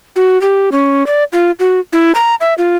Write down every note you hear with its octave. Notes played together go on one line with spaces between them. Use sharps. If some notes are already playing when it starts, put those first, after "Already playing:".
F#4
G4
C#4
D5
F4
F#4
E4
A#5
E5
F4